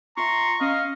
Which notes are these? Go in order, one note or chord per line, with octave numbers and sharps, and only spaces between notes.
F4 E5 A#5 C6 C#6
C#4 D#5 F5